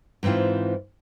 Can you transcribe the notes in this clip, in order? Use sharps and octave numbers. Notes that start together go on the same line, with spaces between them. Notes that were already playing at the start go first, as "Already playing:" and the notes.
G#2 E3 C4 E4 F4